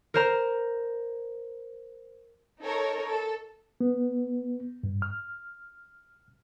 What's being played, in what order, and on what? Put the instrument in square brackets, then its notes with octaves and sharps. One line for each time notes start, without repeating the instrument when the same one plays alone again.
[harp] A#4 C5 A#5
[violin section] D#4 A4 A#4 C#5
A4
[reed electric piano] B3
G2
F6